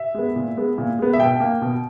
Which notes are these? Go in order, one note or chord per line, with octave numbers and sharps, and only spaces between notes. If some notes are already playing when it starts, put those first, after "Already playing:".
Already playing: E5
G#3 B3
A#2
G#3 B3
A#2
G#3 B3
E5
B2 G5
A#3
B2